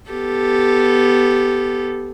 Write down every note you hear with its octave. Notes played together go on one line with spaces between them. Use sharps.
B3 G4 A4